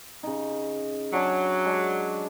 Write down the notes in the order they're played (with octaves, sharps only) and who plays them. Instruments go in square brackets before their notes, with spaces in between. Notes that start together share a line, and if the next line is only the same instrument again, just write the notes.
[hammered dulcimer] C#3 D#4
[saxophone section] F#3 [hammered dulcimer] D4 G#4
[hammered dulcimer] G#3 D4 G#4